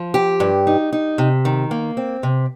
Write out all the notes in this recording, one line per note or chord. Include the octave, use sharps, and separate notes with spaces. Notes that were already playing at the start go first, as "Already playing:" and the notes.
Already playing: F3
G4
G2
D#4
D#4
C3
D#3
A#3
C4
C3